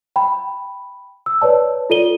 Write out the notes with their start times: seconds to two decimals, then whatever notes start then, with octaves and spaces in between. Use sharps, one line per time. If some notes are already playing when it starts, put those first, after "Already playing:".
0.16 G5 B5
1.26 E6
1.42 B4 C#5 D5 A5
1.90 F4 A4 D5 D#7 G7